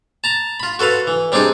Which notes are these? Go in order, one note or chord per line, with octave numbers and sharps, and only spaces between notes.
A5 A#5
F4 B5
F#4 A4 B4 F5
E3
G3 C4 D4 D#4 G#4